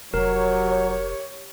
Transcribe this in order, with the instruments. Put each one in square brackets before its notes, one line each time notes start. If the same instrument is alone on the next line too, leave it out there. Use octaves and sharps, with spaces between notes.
[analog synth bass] F1 [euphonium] F#3 [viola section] G4 C#5 [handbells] A#4